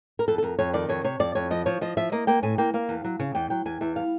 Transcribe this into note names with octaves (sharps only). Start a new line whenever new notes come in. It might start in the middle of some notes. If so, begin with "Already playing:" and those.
A#4
F2 A4
A4
F2 A#4
F2 C#5
D#3 D5
F2 C#5
C3 C#5
F2 D5
F2 C#5
F3 D#5
F3 C#5
F3 D#5
F3 E5
A#3 D#5
A#3 G5
A2 G#5
A#3 G5
A#3 F5
E2
F#3
C#3
E2 G5
F#3 G5
E2 G#5
E2 E5
G3 F5